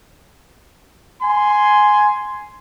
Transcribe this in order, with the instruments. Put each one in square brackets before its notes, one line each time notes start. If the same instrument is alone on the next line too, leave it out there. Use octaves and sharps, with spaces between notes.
[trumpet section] G#5 C6